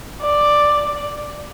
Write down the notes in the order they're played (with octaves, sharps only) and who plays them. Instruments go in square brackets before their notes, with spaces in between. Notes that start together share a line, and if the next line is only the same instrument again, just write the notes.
[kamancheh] D5